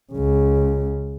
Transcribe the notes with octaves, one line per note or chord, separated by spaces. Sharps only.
C#2 C#3